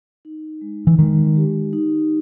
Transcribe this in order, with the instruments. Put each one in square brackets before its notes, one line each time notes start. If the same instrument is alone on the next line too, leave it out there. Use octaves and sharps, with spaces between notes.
[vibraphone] D#4
G#3
[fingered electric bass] E3
[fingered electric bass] D#3 [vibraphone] G#3
[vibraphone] G4
D#4